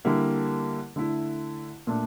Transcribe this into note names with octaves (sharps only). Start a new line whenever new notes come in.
D3 G3 A#3 E4
D3 A3 E4
A#2 A3 D4